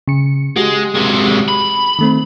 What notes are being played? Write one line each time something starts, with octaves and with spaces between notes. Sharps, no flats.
C#3 C#7
G#3 F#4 G4
C3 G#3
B5
D#3 A3 C4